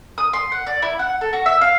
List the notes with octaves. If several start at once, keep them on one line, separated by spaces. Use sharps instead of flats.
D#6
C6
F#5
D5
E4
F#5
A4
F#4
E5
F5